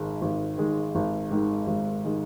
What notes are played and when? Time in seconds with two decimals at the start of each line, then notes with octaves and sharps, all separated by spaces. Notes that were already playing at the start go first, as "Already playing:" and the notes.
Already playing: G#1 G#2 D#3 G#3
0.22 G#1
0.58 G#2 D#3 G#3
0.95 G#1
1.31 G#2 D#3 G#3
1.67 G#1
2.05 D#3 G#3